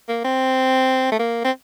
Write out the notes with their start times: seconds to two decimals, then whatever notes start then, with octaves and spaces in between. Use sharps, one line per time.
0.09 A#3
0.24 C4
1.12 A3
1.19 A#3
1.44 C4